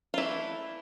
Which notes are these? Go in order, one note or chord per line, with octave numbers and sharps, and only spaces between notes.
F4
E3 A3 D4 E4